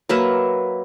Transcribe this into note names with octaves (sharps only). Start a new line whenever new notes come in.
F#3 A#3 B4 E5